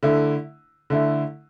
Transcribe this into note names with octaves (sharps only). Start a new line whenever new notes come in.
D3 A3 E4
D3 A3 E4